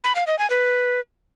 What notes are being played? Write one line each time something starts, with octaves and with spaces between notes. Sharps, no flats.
B5
F5
D#5
G#5
B4